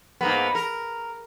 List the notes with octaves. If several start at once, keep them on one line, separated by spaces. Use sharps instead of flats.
G#2 A#3 B3
A#4